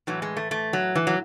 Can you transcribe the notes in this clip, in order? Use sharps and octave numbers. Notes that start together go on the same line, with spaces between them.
A2 E3 F#3
G#3
A3
A3
F#3
E3
F#3